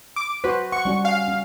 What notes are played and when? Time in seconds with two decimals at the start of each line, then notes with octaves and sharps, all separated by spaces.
0.16 D6
0.44 F#4 B4 C5
0.72 F#5 C#6
0.85 G3 C#4 F#4
1.05 F5
1.28 C#4